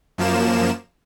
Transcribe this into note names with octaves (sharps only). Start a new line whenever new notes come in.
F#2 F3 A#3 E7